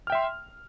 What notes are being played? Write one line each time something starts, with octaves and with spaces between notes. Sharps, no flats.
E5 G5 C6 F6